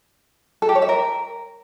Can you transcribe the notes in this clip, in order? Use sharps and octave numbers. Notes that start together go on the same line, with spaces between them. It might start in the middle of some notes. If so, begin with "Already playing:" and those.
A4
G4
C#5
E5
A#4